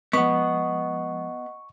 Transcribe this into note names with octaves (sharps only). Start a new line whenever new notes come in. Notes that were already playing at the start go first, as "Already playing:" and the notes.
F3 G#3 B3 D#5 F#5 C#6